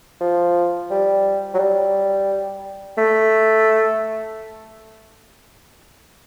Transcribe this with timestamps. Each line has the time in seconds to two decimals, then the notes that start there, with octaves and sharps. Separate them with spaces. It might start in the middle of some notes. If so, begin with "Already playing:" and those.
0.21 F3
0.90 G3
1.54 F#3
1.59 G3
2.98 A3